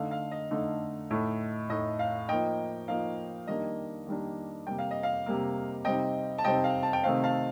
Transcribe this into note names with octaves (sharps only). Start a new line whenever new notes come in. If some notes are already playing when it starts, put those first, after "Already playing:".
Already playing: D3 A3 D#4 F5
F5
D#5
D3 A3 D#4
A2 A3 D#4
A2 A3 D#4 D#5
F5
F3 A#3 D#4 D#5 G5
F3 A#3 D#4 F5
D#3 G3 A#3 D4 D#5
D#3 G3 A#3 D4
C3 G3 A#3 G5
F5
D#5
F5
C3 G3 A#3
C3 G3 C4 D#4 D#5 G5
A5
C3 G3 C4 D#4 D#5 G5
F5
A5
G5
C3 D#3 A3 C4 D#4 F5
F5 A5